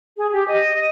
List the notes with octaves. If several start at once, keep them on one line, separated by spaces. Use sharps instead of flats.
G#4
G4
D#5
D#5